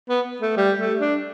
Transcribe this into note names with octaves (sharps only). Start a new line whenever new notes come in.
B3
A3
G3
A3
D4